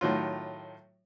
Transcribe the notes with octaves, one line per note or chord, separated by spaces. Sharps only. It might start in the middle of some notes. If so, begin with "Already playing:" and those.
A2 D#3 F#3 F4